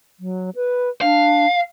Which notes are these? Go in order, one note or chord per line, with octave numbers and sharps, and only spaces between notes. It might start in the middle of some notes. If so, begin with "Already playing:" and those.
F#3
B4
D4 F5